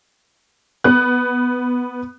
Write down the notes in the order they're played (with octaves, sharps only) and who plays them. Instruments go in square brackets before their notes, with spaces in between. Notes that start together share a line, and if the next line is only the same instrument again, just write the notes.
[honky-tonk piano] B3 F#6